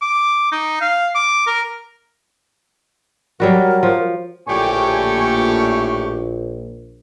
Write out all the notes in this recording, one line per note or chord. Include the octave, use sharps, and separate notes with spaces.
D6
D#4
F5
D6
A#4
F#3 G3 F#4 A#4
F3
A#1 A2 D3 G4 G#5 C#6